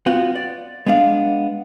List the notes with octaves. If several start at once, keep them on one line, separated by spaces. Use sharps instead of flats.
B3 C4 F4 F#4 F5
D5
G#3 B3 D4 F5